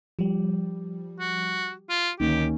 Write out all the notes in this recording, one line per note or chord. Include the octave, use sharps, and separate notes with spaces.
F3 G3 G4
F#4
F4
D2 D#3 A#3 C#4 D#4 G4